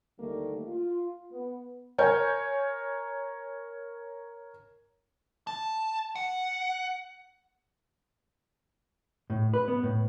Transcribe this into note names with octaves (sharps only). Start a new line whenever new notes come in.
D2 D#3 G3 A3 A#3
F4
B3
A#4 C#5 G#5 G6
A5
F#5
A2
B4
B3
A2